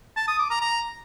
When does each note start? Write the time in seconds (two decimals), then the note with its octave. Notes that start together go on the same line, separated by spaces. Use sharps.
0.17 A5
0.28 D#6
0.39 D6
0.50 A#5
0.61 A#5